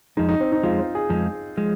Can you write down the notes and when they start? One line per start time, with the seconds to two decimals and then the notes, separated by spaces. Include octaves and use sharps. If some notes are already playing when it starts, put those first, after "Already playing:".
0.17 F2 F3 G#3 D#4
0.29 D#4
0.40 C4
0.52 D#4
0.63 F2 F3 G#3 F4
0.79 C5
0.95 G#4
1.10 F2 F3 G#3
1.57 F3 G#3